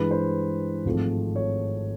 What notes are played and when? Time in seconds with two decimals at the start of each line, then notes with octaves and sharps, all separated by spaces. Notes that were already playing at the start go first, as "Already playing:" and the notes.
Already playing: G2 E3 G#3 B4
0.11 C5
0.85 G#1 G#2 F3 A3 C4
1.36 C#5